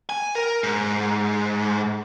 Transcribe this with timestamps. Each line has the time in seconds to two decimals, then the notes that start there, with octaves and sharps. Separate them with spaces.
0.09 G#5
0.35 A#4
0.63 G#2